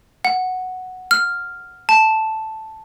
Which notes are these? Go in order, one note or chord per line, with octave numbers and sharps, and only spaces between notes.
F#5
F6
A5